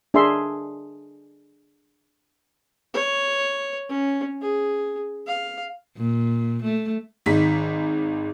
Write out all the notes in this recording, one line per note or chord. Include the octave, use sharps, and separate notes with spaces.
D4 G#4 A#4 E5 C6
C#5
C#4
G#4
F5
A#2
A3
G#1 D#3 G#3 D#4 B6